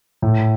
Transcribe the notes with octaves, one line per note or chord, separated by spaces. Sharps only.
A2